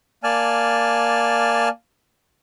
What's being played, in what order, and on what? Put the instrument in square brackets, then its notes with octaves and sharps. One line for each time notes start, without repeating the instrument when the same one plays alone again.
[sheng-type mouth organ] A#3 D5 G#5 A5 F6